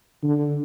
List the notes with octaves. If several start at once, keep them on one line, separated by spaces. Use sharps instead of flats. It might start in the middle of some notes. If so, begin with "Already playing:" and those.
D3